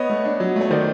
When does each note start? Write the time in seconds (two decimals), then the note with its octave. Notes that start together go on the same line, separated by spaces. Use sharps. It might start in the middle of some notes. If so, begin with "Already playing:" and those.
Already playing: B3 C#5 D#5
0.10 A3
0.25 D4
0.40 F#3
0.56 A3 C#5
0.71 D#3 C5 D5